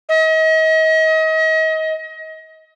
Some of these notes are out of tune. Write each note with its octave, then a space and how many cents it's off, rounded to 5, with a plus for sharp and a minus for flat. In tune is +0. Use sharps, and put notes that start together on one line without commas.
D#5 +35